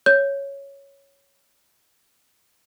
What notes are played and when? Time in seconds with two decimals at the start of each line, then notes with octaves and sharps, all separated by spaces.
0.06 C#5 G6